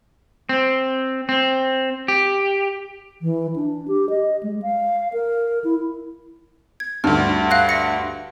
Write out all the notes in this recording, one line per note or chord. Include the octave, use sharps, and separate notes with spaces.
C4
C4
G4
E3
D4
G4
D#5
G#3
F5
A#4
E4
G#6
D2 G2 F6
F5 F#6 A#6
E5 A#6 C#7